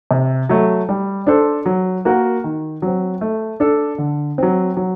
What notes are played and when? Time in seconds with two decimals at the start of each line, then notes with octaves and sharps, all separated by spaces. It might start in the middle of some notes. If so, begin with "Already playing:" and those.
0.11 C3
0.49 F#3 A3
0.89 G3
1.27 D4 A4 C5
1.66 F#3
2.05 A#3 F#4 A#4
2.44 D#3
2.82 F#3 C4
3.21 A3
3.60 D4 A4
3.98 D3
4.38 F#3 C4
4.77 F#3